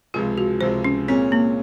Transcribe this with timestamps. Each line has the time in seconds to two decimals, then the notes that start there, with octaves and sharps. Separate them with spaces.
0.14 C#2 C3 F3 G#3 F4
0.38 F#4
0.61 C#2 C3 F3 G#3 C5
0.84 C#4
1.08 A#2 G#3 C4 C#4
1.32 A#3